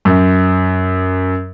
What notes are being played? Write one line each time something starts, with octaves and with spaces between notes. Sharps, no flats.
F#2